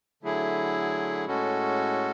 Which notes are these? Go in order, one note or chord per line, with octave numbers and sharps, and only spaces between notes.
D3 F#3 A3 E4 G#4
A2 G#3 C#4 F#4 A4